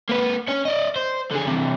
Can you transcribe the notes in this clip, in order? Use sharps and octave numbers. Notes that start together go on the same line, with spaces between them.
A#3 B4
C#4 C#5
D5 D#5
C5
D3 G#4
C3 E3